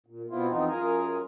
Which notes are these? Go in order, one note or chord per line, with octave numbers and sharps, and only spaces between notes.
A#2
B2 B3 C4 E4 F4
F2 E3 B3 C4 D#4 F4
F#2 F4 G#4 A#4 G#5 A#5